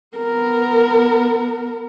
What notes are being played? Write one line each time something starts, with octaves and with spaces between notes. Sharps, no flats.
B3 A#4